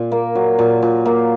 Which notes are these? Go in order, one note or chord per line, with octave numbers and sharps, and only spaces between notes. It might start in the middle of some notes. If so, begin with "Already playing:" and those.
Already playing: A#2
A#3
F#3
A#2
A#2
A#3